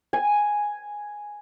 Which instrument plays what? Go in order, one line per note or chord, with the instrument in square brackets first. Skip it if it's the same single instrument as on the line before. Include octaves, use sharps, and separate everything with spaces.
[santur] G#5